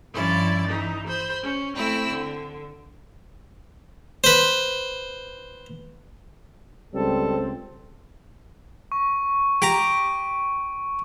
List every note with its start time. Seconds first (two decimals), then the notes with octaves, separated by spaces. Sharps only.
0.13 G2 F3 C#4 E4 D5
0.67 E3 D#4
1.07 C5 B5
1.42 C#4
1.75 A3 C4 E4 E6
2.09 D3
4.24 B4 C5
6.94 C#2 G3 C4 A4
8.92 C#6
9.62 G4 A#5